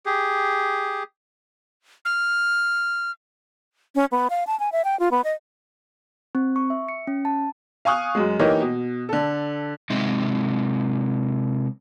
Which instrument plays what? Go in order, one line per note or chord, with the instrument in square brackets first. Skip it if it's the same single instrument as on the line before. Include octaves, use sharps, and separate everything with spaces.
[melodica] G4 G#4
[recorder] F6
[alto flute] C#4
B3
F5
A5
G#5
E5
G5
F4
B3
D#5
[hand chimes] C4
C#6
E5
C#7
C#4
A5
[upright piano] F5 G#5 C#6 D#6 F#6
F#2 G#3
E3 A#3 D#4 G4 C#5 D#5
B2
D3 A4
[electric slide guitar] C3 G#3 D#4 D#5 E5